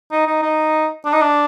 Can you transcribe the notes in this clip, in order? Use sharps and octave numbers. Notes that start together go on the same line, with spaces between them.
D#4
D#4
D#4
D4
D#4
D4